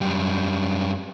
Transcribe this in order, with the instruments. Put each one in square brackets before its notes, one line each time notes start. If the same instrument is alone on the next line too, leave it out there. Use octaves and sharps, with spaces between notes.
[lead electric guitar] F#2 G3